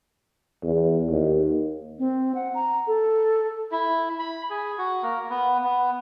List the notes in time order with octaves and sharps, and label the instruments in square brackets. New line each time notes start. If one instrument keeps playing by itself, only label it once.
[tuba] E2
D#2
[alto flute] C4
F#5
A#5
A4
[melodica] E4
B5
G#4
F#4
A#3
B3
B3